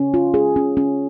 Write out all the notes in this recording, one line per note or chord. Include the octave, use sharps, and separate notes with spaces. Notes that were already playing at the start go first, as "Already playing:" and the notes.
Already playing: C#4
F4
G#4
C#4
C#4